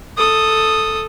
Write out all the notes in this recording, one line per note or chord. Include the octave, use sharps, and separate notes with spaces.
A4 D#6